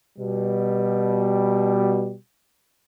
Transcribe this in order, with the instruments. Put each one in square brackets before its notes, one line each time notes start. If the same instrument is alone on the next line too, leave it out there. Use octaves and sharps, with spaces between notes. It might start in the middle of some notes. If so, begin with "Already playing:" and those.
[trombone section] B2 G3